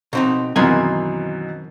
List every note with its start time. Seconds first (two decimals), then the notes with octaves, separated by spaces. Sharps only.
0.13 B2 C4 D#4
0.56 F#2 B2 D#3 E3 C4 G#5